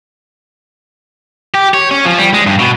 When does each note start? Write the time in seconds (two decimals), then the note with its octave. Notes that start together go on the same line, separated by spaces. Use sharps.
1.55 G4
1.74 C#5
1.91 C#4
2.05 F3
2.18 G3
2.34 G#3
2.47 G2
2.60 B2